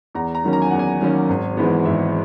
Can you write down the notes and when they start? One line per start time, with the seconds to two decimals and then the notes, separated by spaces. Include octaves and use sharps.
0.15 E2 A#5
0.35 A#5
0.44 D#3 F#3 A#3 C#4
0.53 A#5
0.62 G#5
0.71 E2 F#5
0.79 G#5
1.01 D#3 F#3 A#3 C#4
1.29 G#1
1.57 G#2 E3 G#3 B3
1.85 G#1 E5